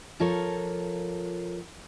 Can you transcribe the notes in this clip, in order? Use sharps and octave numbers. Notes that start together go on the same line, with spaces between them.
F3 F4 A4 A#4 C#5